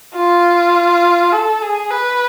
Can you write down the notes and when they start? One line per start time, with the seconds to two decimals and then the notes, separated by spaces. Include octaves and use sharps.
0.15 F4
1.32 A4
1.62 G#4
1.91 B4